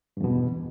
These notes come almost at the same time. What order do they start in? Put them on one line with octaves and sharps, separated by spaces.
G2 E2 B2